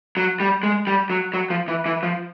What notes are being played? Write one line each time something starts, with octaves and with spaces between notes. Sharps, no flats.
F#3
G3
G#3
G3
F#3
F#3
F3
E3
E3
F3